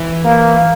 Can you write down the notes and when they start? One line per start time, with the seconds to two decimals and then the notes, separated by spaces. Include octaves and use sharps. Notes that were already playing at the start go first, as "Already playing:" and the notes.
Already playing: E3 E4
0.25 A#3